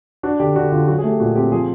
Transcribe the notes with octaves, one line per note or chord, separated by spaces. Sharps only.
D4 F#4
D3 G4
D3 F#4
D3 F4
F#3 F#4
G#4
A3
G4
A#2 F#4
C4 G4
F3 G#4